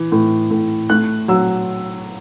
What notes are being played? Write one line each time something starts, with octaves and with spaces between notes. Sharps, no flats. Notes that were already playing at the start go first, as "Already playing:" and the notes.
Already playing: E3
A2
A2
A3 F#6
F#3 E6